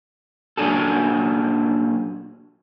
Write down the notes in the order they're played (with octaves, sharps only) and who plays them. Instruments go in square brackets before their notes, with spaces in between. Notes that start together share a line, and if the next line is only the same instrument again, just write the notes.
[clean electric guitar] A#2 F#3 C#4 D4 G#4 A4